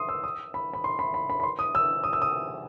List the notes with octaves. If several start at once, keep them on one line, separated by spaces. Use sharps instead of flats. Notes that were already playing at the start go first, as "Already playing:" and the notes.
Already playing: C6 D#6
E6
D#6
B5
B5
C6
B5
B5
B5
B5
C6
D#6
E6
D#6
E6
D#6